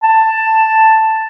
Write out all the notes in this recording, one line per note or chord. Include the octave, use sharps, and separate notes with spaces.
A5